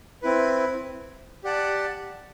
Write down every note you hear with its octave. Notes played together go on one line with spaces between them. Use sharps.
C4 E4 B4
G4 D5 F#5 A5